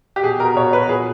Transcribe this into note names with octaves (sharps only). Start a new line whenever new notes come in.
G4
B2 G#4
B2 A#4
B2 C#5
B2 B4
A#2 G#4